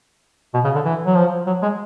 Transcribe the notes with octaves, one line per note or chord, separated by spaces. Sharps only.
B2
C#3
D3
E3
F#3
F3
F#3
G#3